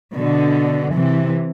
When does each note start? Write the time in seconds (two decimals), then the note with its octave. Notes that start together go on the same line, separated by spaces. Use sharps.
0.15 B2 D3
0.95 C3 E3